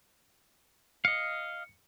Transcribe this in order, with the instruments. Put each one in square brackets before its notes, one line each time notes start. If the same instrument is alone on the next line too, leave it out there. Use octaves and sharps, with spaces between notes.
[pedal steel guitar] D#5 F5 [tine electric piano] C#7